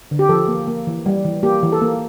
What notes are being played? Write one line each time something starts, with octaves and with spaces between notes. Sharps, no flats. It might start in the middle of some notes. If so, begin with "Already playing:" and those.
D3
G4
F3 A4
A#3
A#3
E3
G3
E3
A#3 G4
E3
A4
A#3